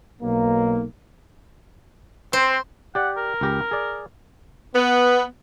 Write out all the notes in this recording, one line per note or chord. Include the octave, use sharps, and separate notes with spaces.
B1 A#3
C4 C5
G4 D5 F#5
A#4
C#2 G4 A#5
G#4 D5
B3